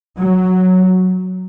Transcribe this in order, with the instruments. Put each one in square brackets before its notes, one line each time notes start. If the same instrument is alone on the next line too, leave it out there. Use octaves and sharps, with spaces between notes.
[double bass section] F#3